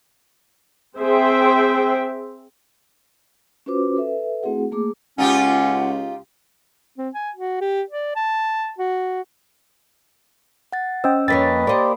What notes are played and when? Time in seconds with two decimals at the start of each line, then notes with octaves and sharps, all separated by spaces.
0.97 C4 G#4 C5 E5 G5
3.66 C#4 F4 F#4 B4 C5 D6
3.96 A4 B4 E5
4.43 A3 C4 E4 F#4 G#4 F#5
4.72 A3 A#3 G#4 D6
5.18 C#2 C#4 D#4 F4 G4 F#5
6.98 C4
7.14 G#5
7.35 F#4
7.61 G4
7.90 D5
8.15 A5
8.78 F#4
10.73 F#5 A6
11.04 C#4 C5 D#5 G5 E6
11.28 F2 A#3 C#4 B4 D#5 G5 A6 B6
11.67 A#3 G4 C5 D5 D#5 B5